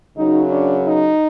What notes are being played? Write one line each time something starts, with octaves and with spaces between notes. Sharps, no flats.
F#2 C#3 F#3 D#4
D4
D#4